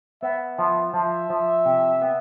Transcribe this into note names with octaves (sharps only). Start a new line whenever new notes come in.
B3 E5
F3 E5
F3 E5
F3
C3
B3